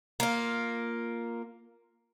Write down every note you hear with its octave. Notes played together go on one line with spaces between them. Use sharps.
A#3 F4